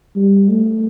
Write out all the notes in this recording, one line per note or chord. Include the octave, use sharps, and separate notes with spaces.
G3
A3